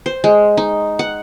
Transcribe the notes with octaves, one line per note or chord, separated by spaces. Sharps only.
C5
G#3
D#4
F#5